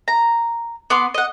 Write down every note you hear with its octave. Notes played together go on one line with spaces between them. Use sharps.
A#5
B3 F#5 C6 D6
D#5 F#5